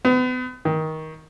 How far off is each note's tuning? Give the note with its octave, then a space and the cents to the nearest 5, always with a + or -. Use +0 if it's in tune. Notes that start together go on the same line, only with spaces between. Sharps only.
B3 +35
D#3 +20